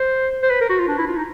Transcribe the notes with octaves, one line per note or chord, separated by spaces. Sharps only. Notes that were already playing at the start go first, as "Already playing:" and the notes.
Already playing: C5
C5
B4
A#4
F#4
F4
D4
E4
F4
D#4